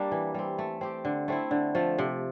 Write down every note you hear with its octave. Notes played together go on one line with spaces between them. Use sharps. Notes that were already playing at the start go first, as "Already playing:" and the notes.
Already playing: G3 A#3 D4
E3
G3 C4
A3
C4 G4
D3
A3 C4 E4
D3
F3 A3
C3